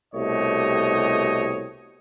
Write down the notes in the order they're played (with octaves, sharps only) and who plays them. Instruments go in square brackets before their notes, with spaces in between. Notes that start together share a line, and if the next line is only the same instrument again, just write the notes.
[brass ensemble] C2 B2 A3 G4 C#5 D#5